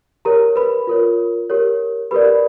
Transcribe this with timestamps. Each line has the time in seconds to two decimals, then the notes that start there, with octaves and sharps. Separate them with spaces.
0.25 G4 A#4 C#5 A#5
0.56 B4 B5
0.87 F4 A#4 C#5
1.50 G4 A#4 C#5
2.11 G4 A#4 B4 D5 B5